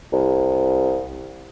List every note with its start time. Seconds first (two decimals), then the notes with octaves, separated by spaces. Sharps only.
0.13 C2